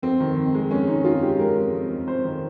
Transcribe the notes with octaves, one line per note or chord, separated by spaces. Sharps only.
F2 C4
D#3
F2
G#3
F2 C#4
D#3 D#4
F2 F4
G#3 G4
G#3 A#4
F2
F2
F2
F2 C5
D#3